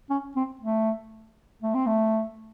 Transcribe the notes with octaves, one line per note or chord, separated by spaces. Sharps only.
C#4
C4
A3
A3
C4
A3